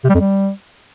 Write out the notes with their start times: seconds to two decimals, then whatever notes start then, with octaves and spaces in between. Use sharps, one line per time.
0.04 C3
0.09 G3
0.14 F2
0.20 G3